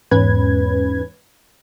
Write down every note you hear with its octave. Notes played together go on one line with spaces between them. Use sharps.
E2 G#2 C#4 B4 G#6